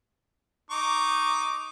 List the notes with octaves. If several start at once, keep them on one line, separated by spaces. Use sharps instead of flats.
D#4 C#6 D6